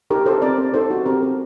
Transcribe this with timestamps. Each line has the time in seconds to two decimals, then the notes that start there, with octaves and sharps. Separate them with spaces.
0.10 D#4 G4 A#4
0.26 G4 A4 C5
0.42 C4 A#4 D5
0.58 C4
0.74 D#4 A4 C5
0.91 F#4
1.06 C4 G4 A#4
1.23 C4